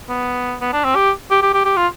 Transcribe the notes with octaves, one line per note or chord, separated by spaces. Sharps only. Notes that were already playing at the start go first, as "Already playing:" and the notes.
B3
B3
D4
C4
G4
G4
G4
G4
G4
F4